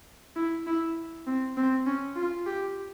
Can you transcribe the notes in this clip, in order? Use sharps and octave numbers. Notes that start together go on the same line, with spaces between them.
E4
E4
C4
C4
C#4
F4
G4